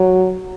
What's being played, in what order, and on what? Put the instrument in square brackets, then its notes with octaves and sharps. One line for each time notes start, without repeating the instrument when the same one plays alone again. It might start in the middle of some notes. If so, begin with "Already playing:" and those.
Already playing: [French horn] F#3